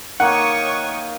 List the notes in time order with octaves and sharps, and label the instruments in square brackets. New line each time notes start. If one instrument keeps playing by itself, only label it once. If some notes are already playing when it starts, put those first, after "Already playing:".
[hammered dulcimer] D#3 A#3 D#4 [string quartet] C#5 C#6 D#6 [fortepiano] F#5